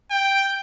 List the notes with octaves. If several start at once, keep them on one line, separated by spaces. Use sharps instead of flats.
G5